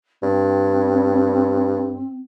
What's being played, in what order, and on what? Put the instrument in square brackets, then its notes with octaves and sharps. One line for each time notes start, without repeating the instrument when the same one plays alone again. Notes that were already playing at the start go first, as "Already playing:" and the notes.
[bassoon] G2 [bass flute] C4